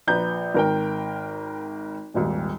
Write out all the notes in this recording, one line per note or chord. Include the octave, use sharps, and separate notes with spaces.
A#1 B4 A#5 G6
G#1 A#4 G5
D#1 G#1 D#2